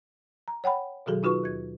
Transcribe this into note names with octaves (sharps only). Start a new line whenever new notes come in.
A#5
C#5 F#5 G5 B5
B2 D#3 F#3 F#4 G#4 A4
D#4 F4 F#4 B4 C#6
D#2 G#6